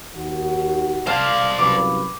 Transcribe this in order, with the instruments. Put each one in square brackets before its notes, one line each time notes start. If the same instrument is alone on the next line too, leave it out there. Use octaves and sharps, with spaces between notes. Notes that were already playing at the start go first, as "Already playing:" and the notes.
[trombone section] D#2 F#4
[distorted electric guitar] C5 D5 [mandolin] F5 A5
[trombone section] C2 F#2 B4 [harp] D6